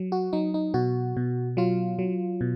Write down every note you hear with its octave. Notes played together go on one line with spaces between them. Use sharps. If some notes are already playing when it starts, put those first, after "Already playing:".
Already playing: F#3
F#4
F#3 D#4
D#4
B2 F#4
B2
F#3 F4
F#3
B2